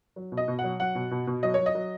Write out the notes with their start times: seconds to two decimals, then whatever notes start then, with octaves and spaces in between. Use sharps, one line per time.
0.16 F#3
0.32 B2
0.37 D#5
0.48 B2
0.59 F#5
0.64 F#3
0.80 F#3 F#5
0.95 B2
1.11 B2
1.27 B2
1.43 F#3 D#5
1.54 F#3 C#5
1.66 D#5
1.75 F#3